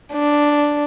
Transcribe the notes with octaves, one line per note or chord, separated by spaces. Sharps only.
D4